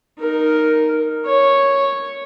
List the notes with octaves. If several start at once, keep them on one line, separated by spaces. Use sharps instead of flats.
D#4 A#4
C#5